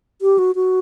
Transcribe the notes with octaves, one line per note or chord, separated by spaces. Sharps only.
G4
F#4
F#4